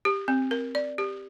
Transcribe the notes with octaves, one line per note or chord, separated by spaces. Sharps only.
G4
C4
A#4
D5
G4